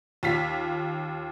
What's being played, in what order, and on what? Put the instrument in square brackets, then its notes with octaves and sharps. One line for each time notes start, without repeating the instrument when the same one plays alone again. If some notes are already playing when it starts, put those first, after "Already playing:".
[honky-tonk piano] D#2 F4 B6